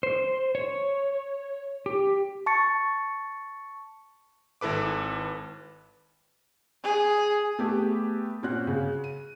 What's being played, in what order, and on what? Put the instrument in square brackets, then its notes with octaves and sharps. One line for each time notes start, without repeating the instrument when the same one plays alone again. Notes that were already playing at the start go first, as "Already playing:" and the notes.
[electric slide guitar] C5
C#5
G4
[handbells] A5 C#6 A6 C#7
[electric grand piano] G#1 E4 A4 B4 D6
[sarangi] G#4
[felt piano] A3 B3 G4 G#4 B4
A#2 C4 C#4 F#4 F#6
C#3
D#7